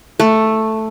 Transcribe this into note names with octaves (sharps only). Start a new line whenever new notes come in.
A3